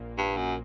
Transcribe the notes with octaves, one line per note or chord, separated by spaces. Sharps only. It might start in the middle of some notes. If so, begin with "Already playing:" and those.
Already playing: A#1 A#2 A#3
G2
F#2